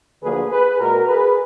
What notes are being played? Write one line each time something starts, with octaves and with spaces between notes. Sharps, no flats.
D2 D3 F3 A#3 G#4 B4
G#4 B4
A#2 G#3 F#4 A#4
G#4 B4